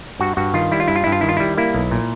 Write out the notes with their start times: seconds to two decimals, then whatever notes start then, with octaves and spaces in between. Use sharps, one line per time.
0.20 G2 F#4
0.37 G2 F#4
0.54 D#3 F4
0.72 G3 E4
0.80 F4
0.88 G2 E4
0.96 F4
1.04 G2 E4
1.12 F4
1.21 D#3 E4
1.29 F4
1.37 G3 E4
1.58 A#3 E4
1.75 B1
1.91 A#2